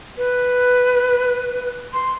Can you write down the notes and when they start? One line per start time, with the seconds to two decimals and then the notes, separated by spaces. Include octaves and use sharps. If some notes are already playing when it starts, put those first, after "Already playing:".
0.17 B4
1.93 C6